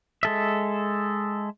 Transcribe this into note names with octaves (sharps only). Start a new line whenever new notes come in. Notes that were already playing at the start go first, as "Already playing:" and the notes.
G#3 A4 E5